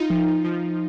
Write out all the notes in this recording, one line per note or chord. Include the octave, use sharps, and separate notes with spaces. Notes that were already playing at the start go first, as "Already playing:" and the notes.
Already playing: D#4 F4
F3
F3